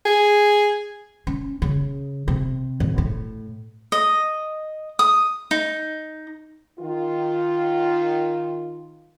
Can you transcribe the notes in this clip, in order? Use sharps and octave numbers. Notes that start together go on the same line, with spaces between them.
G#4
C#4
C#3
C3
G#1
A2
D#5
D#6
D#4
D#3 F4